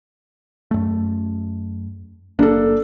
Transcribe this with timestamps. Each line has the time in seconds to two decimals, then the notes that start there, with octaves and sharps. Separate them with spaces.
0.71 F#2 A3
2.39 F#1 A#3 D4 A4